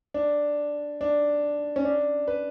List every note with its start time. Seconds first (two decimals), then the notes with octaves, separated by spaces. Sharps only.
0.14 D4
1.01 D4
1.76 C#4
1.85 D4
2.28 B4